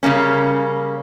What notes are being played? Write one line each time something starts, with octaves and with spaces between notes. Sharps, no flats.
C#3 G3 A#3 C#4